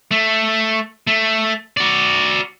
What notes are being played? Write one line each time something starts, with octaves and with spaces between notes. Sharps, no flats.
A3
A3
F#4 D5